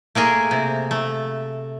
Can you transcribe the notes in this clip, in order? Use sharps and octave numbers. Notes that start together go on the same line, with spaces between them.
A3 A#3 G#4 A#4
C3
A3